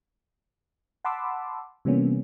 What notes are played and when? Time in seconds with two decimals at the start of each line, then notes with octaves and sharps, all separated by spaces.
1.05 F#5 A5 B5 C6 D6 E6
1.85 C3 E3 G3 A#3 B3 C#4